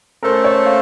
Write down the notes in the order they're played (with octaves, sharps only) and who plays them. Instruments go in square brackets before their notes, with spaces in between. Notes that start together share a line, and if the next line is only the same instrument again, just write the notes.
[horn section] A3 C#4 A4 C5 [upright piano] A#4
[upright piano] C#5
F5